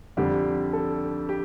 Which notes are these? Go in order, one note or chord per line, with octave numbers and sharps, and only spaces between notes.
F2 D3 G3 G4
A4
G4